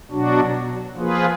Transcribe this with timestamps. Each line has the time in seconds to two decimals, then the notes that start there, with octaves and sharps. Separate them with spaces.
0.11 B2 F#3 D4 F#4
0.96 F3 A#3 F4 G#4 B4